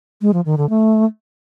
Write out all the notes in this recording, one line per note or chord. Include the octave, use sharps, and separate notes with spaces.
G#3
F3
D#3
D3
A3